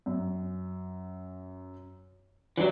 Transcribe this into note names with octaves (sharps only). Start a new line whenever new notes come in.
F#2
E3 F#3 G4 D5